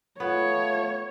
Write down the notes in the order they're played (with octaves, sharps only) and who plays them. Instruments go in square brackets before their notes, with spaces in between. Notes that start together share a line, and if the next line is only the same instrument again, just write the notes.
[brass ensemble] A3 F4 [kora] B3 [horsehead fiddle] C#5